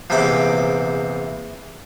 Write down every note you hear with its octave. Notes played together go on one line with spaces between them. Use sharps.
A#1 E2 C3 G5 D6